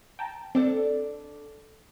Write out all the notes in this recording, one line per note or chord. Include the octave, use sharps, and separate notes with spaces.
G5 A5 A#5
C4 D4 A4 D5